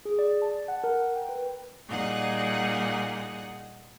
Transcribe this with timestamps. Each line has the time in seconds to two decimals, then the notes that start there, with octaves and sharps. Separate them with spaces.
0.05 G#4
0.19 D5
0.42 A5
0.68 F#5
0.84 A#4
1.16 G5
1.29 B4
1.87 A#2 G3 D#4 G#4 F#5